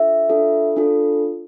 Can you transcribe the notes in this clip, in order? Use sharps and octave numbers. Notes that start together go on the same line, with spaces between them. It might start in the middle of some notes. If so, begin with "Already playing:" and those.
Already playing: D4 F4 A4 E5
D4 F4 A4
D4 F4 A4